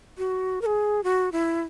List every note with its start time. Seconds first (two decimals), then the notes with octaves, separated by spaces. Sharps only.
0.18 F#4
0.62 A#4
0.66 G#4
1.04 F#4
1.32 E4